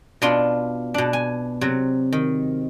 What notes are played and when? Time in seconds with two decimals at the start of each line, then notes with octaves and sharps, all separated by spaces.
0.22 B2 B3 D4 F4 C6
0.94 B2 D4
1.13 G#5
1.61 C3 F#3
2.13 D#3